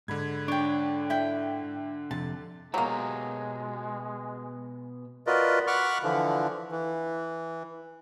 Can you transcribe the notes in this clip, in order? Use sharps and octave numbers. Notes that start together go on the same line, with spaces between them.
G#2 D3 B5 G#6
D4 C#5 G5
E4 G5
F2 C3 A5
B2 F#3 G#3 A#3 G4
F4 F#4 A#4 B4 D5 D#5
F#5 B5 C#6 D6 F6 F#6
D3 E3 F3
E3